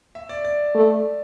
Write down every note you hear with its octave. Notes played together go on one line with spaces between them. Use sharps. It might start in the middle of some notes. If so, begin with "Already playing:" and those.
E5
D5
D5
A3